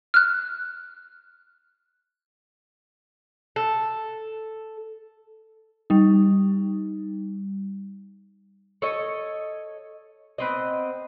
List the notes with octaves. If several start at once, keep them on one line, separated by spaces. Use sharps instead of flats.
F6 F#6
A4
G3 D#4
A4 C#5 D#5
B3 C4 D#5